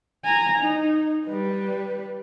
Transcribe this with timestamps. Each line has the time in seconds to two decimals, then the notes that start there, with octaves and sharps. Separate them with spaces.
0.24 G#5 A#5
0.59 D#4
1.27 G3 B4